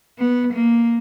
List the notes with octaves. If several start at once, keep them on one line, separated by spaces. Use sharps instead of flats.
B3
A#3